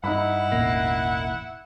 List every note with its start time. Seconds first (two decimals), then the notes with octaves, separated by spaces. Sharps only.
0.04 G2 D#4 E4 F#5 B5
0.52 E1 A1 A#3